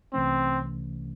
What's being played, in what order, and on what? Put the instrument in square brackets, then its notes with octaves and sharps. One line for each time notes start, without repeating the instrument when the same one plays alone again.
[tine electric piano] C2 C3 E3 A3 C#4 [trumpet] C4